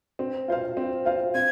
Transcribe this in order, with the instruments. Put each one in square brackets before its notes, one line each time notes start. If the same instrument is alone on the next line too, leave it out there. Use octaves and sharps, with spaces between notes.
[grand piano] C4
F4 C5 F5
C4
F4 C5 F5
[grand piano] C4 [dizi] G#6